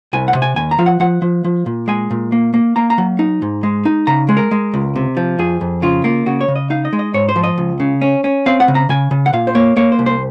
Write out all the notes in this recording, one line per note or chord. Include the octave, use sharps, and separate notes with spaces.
C2 G#5
F#5
C3
G#5
D#2 G#5
A#5
F3 F5
F#5
F3 F#5
F3
F3
A#2
G#3 G#5
A#2
A#3
A#3
A#3 A#5
A#5
F#3
D#4
G#2
G#3
D#4
C#3 A#5
G#3
A#4
G#3
C#2
C3
F3
F2 G#4
F2
C#3 F4
A#3 F4
C#3 F#4
C#5
C#3
D#5
D#4 F5
D#5
G#3
D#5
G#2 C#5
C5
F3
D#5
C#2
C#3
C#4
C#4
C4 F5
F#5
C#3
A#5
C#3 G#5
C#3
F#5
A#2 F5
C5
A#3 C#5
A#3 C#5
C5
C2
C5